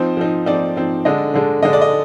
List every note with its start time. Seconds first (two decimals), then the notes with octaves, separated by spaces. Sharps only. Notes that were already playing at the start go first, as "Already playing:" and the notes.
Already playing: F3 C4 D#4 C5
0.17 F3 C4 D#4
0.46 F3 C4 D#4 D5
0.76 F3 C4 D#4
1.05 D3 G#3 D4 D#5
1.34 D3 G#3 D4
1.63 D3 G#3 D4 D#5
1.73 D5
1.82 D#5